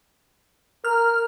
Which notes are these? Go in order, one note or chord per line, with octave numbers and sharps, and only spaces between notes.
A#4 F6